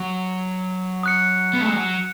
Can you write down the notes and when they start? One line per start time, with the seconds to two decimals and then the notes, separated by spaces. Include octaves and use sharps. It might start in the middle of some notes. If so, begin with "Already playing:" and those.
Already playing: F#3
1.03 D#6 F#6 C#7
1.53 B3
1.61 A3
1.68 G#3
1.76 F#3